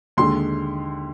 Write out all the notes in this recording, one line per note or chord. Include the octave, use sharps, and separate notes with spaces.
D#2 D3 G#3 C6